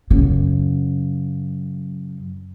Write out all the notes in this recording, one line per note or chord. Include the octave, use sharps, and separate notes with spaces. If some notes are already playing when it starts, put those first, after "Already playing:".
F#2 C#3